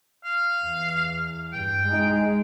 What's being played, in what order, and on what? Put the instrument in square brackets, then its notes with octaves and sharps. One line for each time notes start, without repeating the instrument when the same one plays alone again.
[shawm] F5
[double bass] E2
[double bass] G2 [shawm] G5
[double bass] G#3 D#4